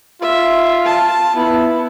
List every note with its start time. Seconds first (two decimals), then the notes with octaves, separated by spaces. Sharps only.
0.22 F4 E5
0.85 A5
1.36 B3 E4